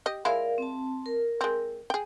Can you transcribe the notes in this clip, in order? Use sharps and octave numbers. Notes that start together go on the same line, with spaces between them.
G4 D#5
G#3 E4 F4 A#4 D5 F5
C4 A5
A#4
G#3 C4
G#4 G5